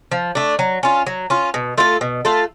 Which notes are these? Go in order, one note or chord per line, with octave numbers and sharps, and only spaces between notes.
F3
A3 D4
F#3
C#4 F4
F#3
C#4 F4
B2
A3 F4 A4
B2
A3 F4 A4